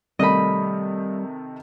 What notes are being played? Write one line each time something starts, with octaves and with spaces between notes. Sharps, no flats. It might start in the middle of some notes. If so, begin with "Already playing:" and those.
C3 D#3 G3 A3 D#5 B5